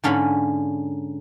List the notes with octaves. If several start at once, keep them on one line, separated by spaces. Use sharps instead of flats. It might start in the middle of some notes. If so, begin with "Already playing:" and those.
G#2 D3 C#4 F5 B5